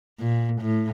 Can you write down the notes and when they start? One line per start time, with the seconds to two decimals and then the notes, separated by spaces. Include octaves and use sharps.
0.19 A#2
0.61 A2